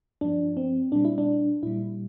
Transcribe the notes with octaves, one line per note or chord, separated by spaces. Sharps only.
G2 F3 D4
C4
A#2 G3 D4
E4
D4
A#2 G3 E4